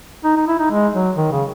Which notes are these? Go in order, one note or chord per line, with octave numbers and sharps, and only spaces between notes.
D#4
D#4
E4
D#4
G#3
F#3
D#3
C#3